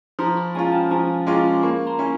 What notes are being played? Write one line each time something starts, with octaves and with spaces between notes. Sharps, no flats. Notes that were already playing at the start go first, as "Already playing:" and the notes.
F3 A#5 C6
B5 C#6
G#3 C#4 F4 G#5 A#5
G5 A5
F3 G#5 A#5
G#3 C#4 F4 C6 D6
A#3 B5 C#6
A#5 C6
C#4 E4